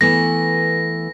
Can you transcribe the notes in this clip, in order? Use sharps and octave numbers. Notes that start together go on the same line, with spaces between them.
E3 A3 B3 A#6